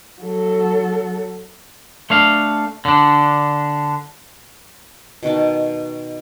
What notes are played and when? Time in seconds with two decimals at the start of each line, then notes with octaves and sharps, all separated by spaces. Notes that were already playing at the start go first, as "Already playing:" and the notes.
0.22 F#3 A4
2.10 A3 D4 F5
2.85 D3 D4
5.23 B2 D#3 F#4 A5